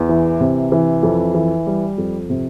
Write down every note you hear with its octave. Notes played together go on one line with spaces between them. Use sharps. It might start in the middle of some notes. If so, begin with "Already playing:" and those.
Already playing: E2
E3
C3
E3
F2
E3
G3
F2
C3